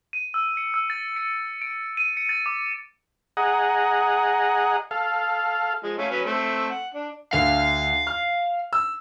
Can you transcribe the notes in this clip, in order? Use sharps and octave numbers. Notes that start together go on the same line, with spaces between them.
D#7
E6
C#7
E6
A6
C#7
D7
D#7
C#7
A6
D6
G#4 D#5 F#5 A#5
A4 F5
F3 G#3
A3 C#4 F5
F#3 C#4 B4
A3 C4
F#5
D4
D2 D3 F5
F6
E6